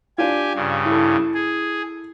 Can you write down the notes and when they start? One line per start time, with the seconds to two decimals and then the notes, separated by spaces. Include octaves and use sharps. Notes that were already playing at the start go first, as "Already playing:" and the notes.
0.18 D4 F4 G4 G#5
0.55 G2 C#3
0.86 E4 A4
1.34 G#4